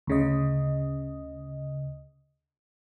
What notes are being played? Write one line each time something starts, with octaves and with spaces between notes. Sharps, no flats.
D2 C#3 D#5